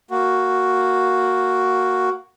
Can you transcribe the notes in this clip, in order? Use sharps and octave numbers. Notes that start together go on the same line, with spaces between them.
A#3 F#4